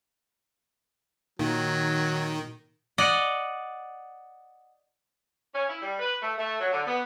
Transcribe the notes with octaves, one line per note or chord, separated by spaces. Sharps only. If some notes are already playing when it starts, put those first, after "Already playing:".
A#2 D#3 F#3
D5 D#5 F#5
C#4
E4
G3
B4
A3
A3
F#3
D3
B3